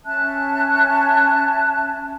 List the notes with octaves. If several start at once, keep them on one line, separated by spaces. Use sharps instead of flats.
C#4 E5 A5 F#6